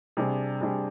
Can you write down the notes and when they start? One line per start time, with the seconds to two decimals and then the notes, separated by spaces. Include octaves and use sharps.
0.17 C3 G3 D4 G#4
0.61 C3 G3 D4 G#4